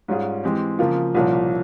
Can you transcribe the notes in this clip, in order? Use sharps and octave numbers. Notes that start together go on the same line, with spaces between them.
G#2 G3 C#4 F4 G#4
E3 G#3 C4 G4
C#3 F3 A#3 F4
C2 A#2 F3 A#3 C#4